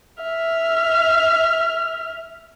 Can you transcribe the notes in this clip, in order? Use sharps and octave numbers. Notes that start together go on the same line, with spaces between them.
E5 F6